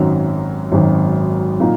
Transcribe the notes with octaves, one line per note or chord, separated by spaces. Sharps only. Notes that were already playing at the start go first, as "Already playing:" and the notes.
Already playing: G#1 F#2 D#3 F#3 C#4
G#1 F#2 D#3 F#3 C#4
A#2 F#3 A#3 D#4